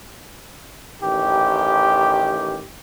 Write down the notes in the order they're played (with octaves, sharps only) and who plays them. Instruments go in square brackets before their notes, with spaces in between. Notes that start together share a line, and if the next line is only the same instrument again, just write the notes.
[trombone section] A1 D#3 G4